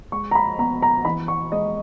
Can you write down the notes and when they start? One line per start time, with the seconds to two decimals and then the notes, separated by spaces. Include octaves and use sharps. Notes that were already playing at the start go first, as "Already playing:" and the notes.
0.12 G#3 C#6
0.31 A#5
0.35 B5
0.58 B3 A#5
0.83 A#5
1.05 E3 B5
1.28 C#6
1.52 G#3 D#5